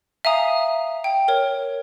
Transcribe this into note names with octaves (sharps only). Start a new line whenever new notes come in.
E5 F5 G#5 A#5 D#6
G5
A#4 C#5